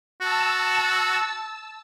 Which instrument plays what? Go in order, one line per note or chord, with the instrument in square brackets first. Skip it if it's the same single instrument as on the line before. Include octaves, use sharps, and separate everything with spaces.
[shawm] F#4 [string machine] A5 E6